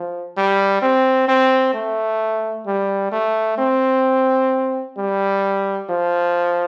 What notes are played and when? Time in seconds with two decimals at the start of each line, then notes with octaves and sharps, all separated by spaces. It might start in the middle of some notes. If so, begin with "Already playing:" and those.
Already playing: F3
0.37 G3
0.82 C4
1.28 C4
1.74 A3
2.67 G3
3.12 A3
3.58 C4
4.98 G3
5.90 F3